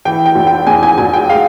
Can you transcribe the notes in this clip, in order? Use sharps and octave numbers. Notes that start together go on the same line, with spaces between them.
E3 G5
G5
F1
G5
E2 G#5
G#5
F1 G#5
G5
G#3 F5